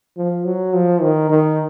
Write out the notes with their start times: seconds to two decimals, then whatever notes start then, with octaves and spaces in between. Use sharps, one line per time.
0.17 F3
0.44 F#3
0.73 F3
1.01 D#3
1.29 D#3